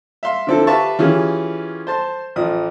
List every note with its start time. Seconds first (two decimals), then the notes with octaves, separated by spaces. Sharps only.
0.23 E5 F5 C6
0.47 D3 F3 C4 E4 A4
0.67 G4 B4 E5 F5 A5 C#6
0.99 E3 C#4 F4 G4 G#4
1.87 C5 A5 C6
2.36 A1 F3 D#6